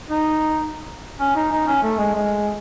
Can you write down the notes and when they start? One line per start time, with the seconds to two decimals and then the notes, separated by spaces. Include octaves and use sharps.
0.09 D#4
1.20 C#4
1.35 D#4
1.52 D#4
1.67 C#4
1.83 A3
1.99 G#3
2.15 G#3